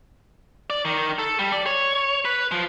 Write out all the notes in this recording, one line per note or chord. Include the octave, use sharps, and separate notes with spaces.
D5
D#3
A4
G3
D5
C#5
B4
F3